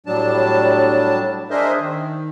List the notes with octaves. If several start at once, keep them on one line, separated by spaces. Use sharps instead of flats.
A2 F#3 G3 D4 A5
D4 G#4 A#4 C5 D#5 E5
D#3